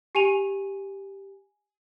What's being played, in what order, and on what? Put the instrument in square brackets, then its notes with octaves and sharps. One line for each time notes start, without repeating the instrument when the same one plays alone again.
[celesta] G4 G#5 D#7 F7